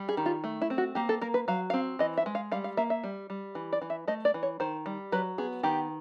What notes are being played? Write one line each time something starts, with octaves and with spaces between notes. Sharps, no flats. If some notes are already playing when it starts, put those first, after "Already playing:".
Already playing: G3
G#4
D#3
F4
A3
E4
C4
F#4
A#3 G4
A4
A#3 A#4
B4
F#3 F5
C4 F5
E3 D#5
E5
G#3
F5
G3 F5
F5
A#3 E5
E5
G3
G3
E3
D5
E3
E5
A3 D#5
D5
E3
C#5
D#3 C5
G3
F#3 B4
B3 G#4
D#3 G4